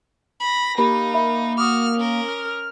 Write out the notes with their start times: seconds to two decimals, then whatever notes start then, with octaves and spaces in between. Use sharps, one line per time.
0.40 B5 A#6
0.78 A#3 D#4 G4 B5
1.14 E5 B5
1.58 F#4 D6 D#6 F6
1.96 C#4 A#4
2.28 F6